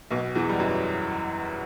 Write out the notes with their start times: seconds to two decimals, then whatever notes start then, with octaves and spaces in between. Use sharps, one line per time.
0.10 B1 B2
0.35 E2 E3
0.49 G3
0.59 F#2 F#3